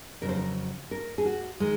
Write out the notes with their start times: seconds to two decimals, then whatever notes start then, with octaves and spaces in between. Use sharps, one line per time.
0.21 F2 C#3 F#3 A#4
0.29 C5
0.36 A#4
0.91 A#4
1.18 G#4
1.25 F#4
1.60 D#3 G#3